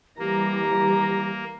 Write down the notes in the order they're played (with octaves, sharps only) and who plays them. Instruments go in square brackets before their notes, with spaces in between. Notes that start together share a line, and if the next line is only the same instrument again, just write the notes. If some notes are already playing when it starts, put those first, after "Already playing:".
[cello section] E3 G3 [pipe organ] A#3 [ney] G4 [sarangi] A#5